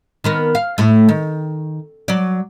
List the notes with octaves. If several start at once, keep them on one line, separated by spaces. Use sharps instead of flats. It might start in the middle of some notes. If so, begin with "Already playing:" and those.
D#3 B3 A#4
F5
A2 A3
D#3
F#3 D5